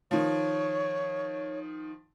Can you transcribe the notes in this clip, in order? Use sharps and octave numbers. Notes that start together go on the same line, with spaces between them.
D#3 F3 C#5